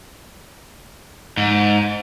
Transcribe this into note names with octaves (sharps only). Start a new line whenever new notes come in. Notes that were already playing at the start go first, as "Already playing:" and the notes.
G#2